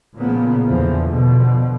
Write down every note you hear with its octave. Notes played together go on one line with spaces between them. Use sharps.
A#2 C#3 F3 A#3 B3
E2 D3 E3 F3
B2 D3 F3